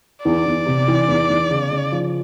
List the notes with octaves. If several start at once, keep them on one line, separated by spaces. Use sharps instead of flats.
E2 D5
E2
C3
E3
E2
E2
C#3
C#3
F3